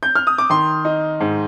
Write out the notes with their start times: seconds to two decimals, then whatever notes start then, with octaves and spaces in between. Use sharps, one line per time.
0.03 G6
0.15 F6
0.27 D#6
0.38 D6
0.50 D#3 C6
0.85 D#4
1.20 G#2